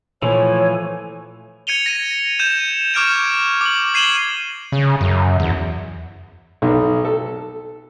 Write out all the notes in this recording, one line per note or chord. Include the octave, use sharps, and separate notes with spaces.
A#2 E3 F3 A3 A4 C#5 G#5
G#6 C#7 D#7 F7 G7
A#6 D#7
G6 D#7 E7
C#6 D6 F6 G#6 D7 E7
D6 F#7
G#6 C7 D#7 E7 F#7 G7
C#3
F#2
E2
B1
A4